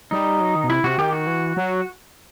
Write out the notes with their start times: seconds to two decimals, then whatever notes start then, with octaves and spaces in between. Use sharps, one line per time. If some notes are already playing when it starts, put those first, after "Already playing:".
0.11 G3 D#4
0.41 F#3
0.56 D#3
0.64 B2
0.70 C3 E4
0.84 C3 F#4
0.98 D#3 G4
1.13 F#4
1.27 E3
1.57 F#3